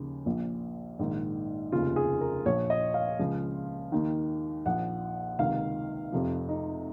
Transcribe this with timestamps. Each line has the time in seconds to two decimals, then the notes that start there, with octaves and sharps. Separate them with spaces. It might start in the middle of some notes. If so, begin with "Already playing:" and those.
Already playing: D#2 C#3 F3
0.26 A#1 A#2 F3
0.99 A#1 G#2 D#3
1.72 F1 D#2 C#3 F4
1.96 G#4
2.21 A#4
2.45 A#1 A#2 F3 C#5
2.70 D#5
2.94 F5
3.19 C#2 C#3 F3
3.92 D#2 D#3
4.66 A#1 A#2 F3 F#5
5.39 C#2 C3 D#3 F5
6.12 F1 F2 C3 F3
6.49 D#4